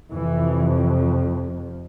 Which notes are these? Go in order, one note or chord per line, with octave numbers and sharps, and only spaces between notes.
F2 C3 E3